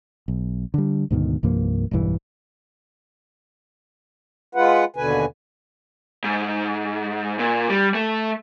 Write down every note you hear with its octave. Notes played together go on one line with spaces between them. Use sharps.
B1
D3 G3
D2 G#2 B2 D#3
C2 G2 F3 A#3
E1 B1 G2 E3
G#3 F4 B4 F#5
D#2 B2 D3 B4 G#5
G#2
A#2
G3
A3